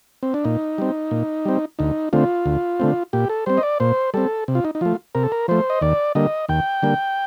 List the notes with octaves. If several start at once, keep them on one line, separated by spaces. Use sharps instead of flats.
C4
D4
A#2 D#4
G3 C4
A#2
G3 C4
D2 D#4
D3 A3 C4 F4
D2
D3 A3 C4
A#2 G4
A4
G3 C4 C5
D#5
D5
A#2 C5
G3 C4 A4
C3
F4
D#4
D#4
F3 A3 F4
C3 A#4
A4
A#4
F3 A3 C5
D#5
D#2 D5
D3 G3 A#3 D#5
D#2 G5
D3 G3 A#3